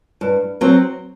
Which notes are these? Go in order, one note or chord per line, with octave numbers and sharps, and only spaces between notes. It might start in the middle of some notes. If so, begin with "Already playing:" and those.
G2
F#3 C4